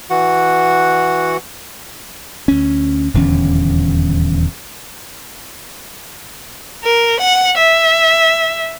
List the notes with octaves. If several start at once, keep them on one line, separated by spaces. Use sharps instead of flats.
E3 F#4 F#5
D2 C#4
D#1 E2 D3 C#4
A#4
F#5
E5